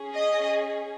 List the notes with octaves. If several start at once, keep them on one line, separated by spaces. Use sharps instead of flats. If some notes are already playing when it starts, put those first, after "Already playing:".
Already playing: C#4 G#4
D#5